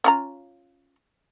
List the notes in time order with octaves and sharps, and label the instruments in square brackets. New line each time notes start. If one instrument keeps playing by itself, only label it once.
[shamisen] C#4 F4 A#5